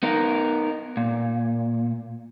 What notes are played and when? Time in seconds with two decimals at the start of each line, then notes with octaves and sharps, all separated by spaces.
0.03 B3 D#4 A#4
0.97 A#2